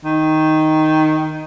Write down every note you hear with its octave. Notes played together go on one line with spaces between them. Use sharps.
D#3